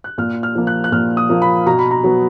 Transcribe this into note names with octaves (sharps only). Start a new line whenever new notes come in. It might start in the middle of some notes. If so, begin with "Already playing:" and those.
F#6
A#2 F6
F6
F3 A#3
F#6
F#6
A#2 F6
D#6
F3 A#3
B5
B2 A#5
B5
A#5
F#3 B3